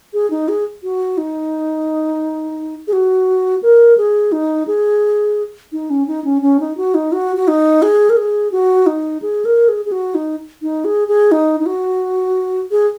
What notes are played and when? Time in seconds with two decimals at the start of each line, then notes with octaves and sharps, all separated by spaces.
0.14 G#4
0.31 D#4
0.48 G#4
0.83 F#4
1.18 D#4
2.88 G#4
2.93 F#4
3.63 A#4
3.98 G#4
4.32 D#4
4.67 G#4
5.72 D#4
5.90 C#4
6.07 D#4
6.25 C#4
6.42 C#4
6.60 D#4
6.77 F#4
6.94 D#4
7.12 F#4
7.36 F#4
7.48 D#4
7.82 G#4
8.10 A#4
8.17 G#4
8.52 F#4
8.86 D#4
9.22 G#4
9.45 A#4
9.69 G#4
9.86 G#4
9.92 F#4
10.15 D#4
10.62 D#4
10.85 G#4
11.08 G#4
11.32 D#4
11.60 D#4
11.66 F#4
12.71 G#4